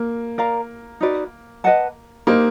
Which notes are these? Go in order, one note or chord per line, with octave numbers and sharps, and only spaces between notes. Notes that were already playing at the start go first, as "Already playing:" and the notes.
Already playing: A#3
A#4 D5 F5 A#5
D#4 F#4 B4 D5
B4 D#5 F#5 A5
A#3 D#4 G4 C5